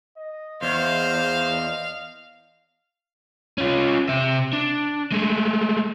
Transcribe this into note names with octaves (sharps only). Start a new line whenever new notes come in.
D#5
E2 C5 F5
C#4 F4
C3 E5
D4
G#3 A3